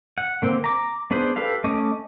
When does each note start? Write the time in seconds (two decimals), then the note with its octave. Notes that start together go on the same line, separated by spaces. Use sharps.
0.18 F#5
0.42 D3 A#3 C4
0.64 A#5 D6
1.11 B3 D4 G#4 B4 C5
1.36 G4 A4 B4 F5
1.64 A3 C#4 D#5 D6